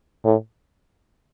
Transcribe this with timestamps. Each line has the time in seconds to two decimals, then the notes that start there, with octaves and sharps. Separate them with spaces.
0.25 A2